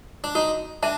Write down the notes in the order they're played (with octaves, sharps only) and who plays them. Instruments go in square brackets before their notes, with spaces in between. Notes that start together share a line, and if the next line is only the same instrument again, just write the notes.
[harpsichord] D4
[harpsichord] D#4 [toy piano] F#4
[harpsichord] D4 [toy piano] E5 A5